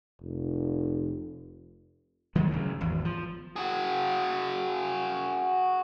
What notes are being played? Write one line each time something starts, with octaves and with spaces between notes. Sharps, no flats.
F1
D#3 F#3 G#3 A3
D2 C#3 F#3
G#1 E2
F3
F#4 G#4